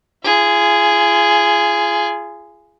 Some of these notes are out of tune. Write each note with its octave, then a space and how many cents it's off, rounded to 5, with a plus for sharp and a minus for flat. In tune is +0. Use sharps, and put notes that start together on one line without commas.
F4 -35 G#4 +0